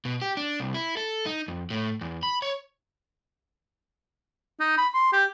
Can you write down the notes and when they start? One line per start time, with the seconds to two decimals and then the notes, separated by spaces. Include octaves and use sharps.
0.05 B2
0.22 G4
0.37 D4
0.60 C2
0.74 E4
0.97 A4
1.26 D#4
1.48 F2
1.70 A2
2.01 E2
2.23 B5
2.42 C#5
4.60 D#4
4.78 B5
4.94 C6
5.13 G4